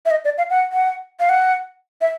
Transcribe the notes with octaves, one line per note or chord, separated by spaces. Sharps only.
E5
D#5
D5
F5
F#5
F#5
F5
F#5
E5